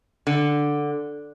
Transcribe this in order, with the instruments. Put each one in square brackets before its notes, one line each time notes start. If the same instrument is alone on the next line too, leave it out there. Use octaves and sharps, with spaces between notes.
[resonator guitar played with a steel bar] D3